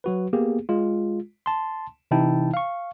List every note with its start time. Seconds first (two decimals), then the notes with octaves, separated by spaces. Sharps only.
0.04 F#3 F#4 B4
0.33 A#3 B3 G4 G#4
0.69 G#3 F4
1.46 A5 C6
2.11 C3 E3 D#4 E4 G5 A5
2.54 F5 C#6